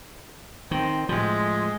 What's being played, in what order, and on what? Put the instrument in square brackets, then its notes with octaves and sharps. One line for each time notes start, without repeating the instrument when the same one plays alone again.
[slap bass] D#3 [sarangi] C4
[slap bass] A2 F3 [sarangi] G#3